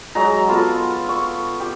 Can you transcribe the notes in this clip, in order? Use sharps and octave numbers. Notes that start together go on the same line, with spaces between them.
F#3 G#3 A#5
B3 F4 A4
C#6
G4